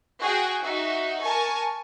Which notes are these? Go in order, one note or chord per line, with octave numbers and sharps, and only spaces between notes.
F#4 G#4 F#5 G5
D#4 F#4 E5
A#4 G#5 A5 C#6